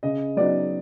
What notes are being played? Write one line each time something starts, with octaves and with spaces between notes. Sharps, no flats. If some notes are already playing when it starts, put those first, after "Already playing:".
C#3 D#5
F#3 B3 D#4 D5